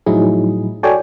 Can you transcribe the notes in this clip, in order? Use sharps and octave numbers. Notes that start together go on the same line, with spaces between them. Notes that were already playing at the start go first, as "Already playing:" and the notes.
A2 F3 F#3 D#4 E4 G#4
F#4 A4 C#5 D5 G5 G#5